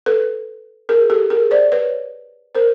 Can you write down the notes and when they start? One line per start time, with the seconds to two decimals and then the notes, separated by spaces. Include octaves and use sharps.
0.06 A4 B4
0.89 G#4 A#4
1.10 G4 A4
1.30 G#4 A#4
1.51 C5 D5
1.72 B4 C#5
2.55 A#4 C5